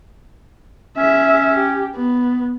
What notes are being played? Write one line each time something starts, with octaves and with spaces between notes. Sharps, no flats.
C#4 G#4 E5
G4
B3